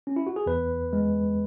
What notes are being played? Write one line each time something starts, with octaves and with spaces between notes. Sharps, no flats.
C#4
E4
F#4
G#4
E2 B4
G#3